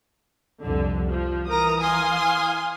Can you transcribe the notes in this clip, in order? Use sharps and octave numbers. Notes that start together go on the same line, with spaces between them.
C2 F2 D3
F3
E3 A#4 A#5 D#6
F5 G#5 C6